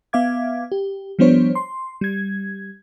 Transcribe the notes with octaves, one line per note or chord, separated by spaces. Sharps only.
B3 E5 F5 D6 G#6
G4
F3 G3 B3 D4 C5 C#5
C6
G3 G#6